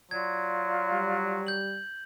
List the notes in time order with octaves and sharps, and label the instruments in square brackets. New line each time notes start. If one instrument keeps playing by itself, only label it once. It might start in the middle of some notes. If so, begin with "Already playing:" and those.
[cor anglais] F#3 [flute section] F4 D5 [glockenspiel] G#6
[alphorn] G3
[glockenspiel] G6 F#7